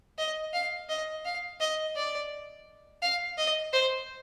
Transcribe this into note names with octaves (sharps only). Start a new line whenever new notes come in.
D#5
F5
D#5
F5
D#5
D5
F5
D#5
C5